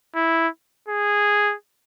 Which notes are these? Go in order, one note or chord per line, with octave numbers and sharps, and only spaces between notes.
E4
G#4